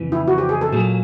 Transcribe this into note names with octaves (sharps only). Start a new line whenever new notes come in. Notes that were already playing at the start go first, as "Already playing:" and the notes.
Already playing: F2 C#3 E3
E4
F#4
G4
G#4
A4
A#2 F#3 A#3 G#4